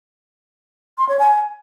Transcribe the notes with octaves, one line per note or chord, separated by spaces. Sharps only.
C6
C#5
G#5